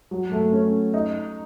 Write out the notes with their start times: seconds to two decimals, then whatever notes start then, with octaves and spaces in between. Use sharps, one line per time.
0.11 F#3
0.32 A3
0.52 C#4
0.94 D#4